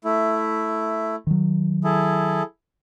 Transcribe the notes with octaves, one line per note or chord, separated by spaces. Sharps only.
A3 E4
D#3 F#3
E4 G#4 A4